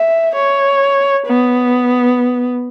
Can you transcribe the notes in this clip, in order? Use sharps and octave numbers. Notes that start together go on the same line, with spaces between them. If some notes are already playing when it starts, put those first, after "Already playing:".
Already playing: E5
C#5
B3